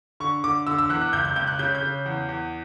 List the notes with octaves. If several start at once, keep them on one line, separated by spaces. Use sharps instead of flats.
D3 C#6
D3 D6
D3 E6
E6
E2 F#6
F#6
C#2 G6
G6
C#2 G6
F#6
C#3 G6
G6
C#3
E2
E2